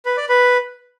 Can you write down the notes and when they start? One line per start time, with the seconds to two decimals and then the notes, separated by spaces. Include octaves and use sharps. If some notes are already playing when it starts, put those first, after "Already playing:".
0.05 B4
0.17 D5
0.29 B4